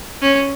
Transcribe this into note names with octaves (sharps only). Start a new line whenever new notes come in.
C#4